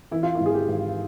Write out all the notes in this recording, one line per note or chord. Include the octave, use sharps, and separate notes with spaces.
E3 E4
F4
E4
G#1
G#4
G4
G#1